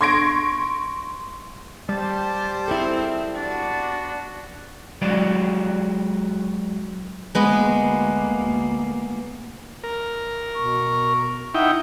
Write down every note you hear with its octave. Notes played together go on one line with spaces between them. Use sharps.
C6 C#6 G#6 A#6 D7
G3 G4 C5 A5
C4 E4 G#4 A4
B3 D4 F#4
F#3 G#3 F#4 D5
D2 G#3 A#3 B3
A#4
B2 B3 C#6
D#4 E4 E5 F#5 G5